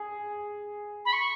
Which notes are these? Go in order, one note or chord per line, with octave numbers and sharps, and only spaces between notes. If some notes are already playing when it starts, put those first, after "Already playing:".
Already playing: G#4
B5
C#6